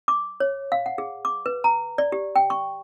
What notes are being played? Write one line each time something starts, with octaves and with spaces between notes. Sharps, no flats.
D6
C#5
F5
F#5
G#4
D6
B4
A#5
D5
G4
G5
C#6